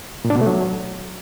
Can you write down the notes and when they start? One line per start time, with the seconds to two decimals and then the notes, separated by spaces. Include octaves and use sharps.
0.25 A#2
0.30 D4
0.36 B2
0.41 A3
0.47 F#3